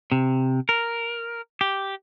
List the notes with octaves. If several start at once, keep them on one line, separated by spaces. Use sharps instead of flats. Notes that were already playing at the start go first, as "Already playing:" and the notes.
C3
A#4
G4